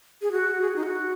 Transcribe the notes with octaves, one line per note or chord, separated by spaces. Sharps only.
G#4
F#4
G#4
F#4
D#4
F#4